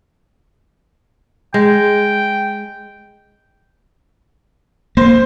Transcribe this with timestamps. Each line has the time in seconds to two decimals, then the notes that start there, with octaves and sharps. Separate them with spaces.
1.54 G#3 G5
4.97 A#3 C5